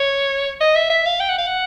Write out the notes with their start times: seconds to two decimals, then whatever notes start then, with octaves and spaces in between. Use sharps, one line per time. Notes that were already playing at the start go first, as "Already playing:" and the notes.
Already playing: C#5
0.61 D#5
0.76 E5
0.90 E5
1.06 F5
1.20 G5
1.29 F#5
1.38 F5
1.47 F#5